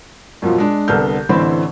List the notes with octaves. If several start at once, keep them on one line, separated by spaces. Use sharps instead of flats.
F#2 B2 F3 F4
G#3 D4
C2 D3 B3 A4 F6 G6
A1 D3 E3 C4 C5 B5